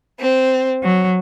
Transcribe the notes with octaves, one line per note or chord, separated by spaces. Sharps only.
C4
F#3